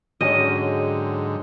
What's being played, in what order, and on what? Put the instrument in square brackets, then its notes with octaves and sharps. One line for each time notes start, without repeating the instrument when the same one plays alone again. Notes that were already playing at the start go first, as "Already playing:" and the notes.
[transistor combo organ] G#2 D3 [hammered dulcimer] F#3 C#4 G4 [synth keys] G#4 C#5 [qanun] D#5